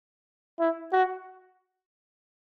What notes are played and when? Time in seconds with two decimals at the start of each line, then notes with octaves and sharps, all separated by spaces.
0.59 E4
0.93 F#4